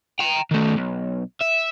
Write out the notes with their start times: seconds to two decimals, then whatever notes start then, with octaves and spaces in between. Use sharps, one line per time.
0.19 G5 A#5
0.51 D#3 A3
0.77 B1
1.41 E5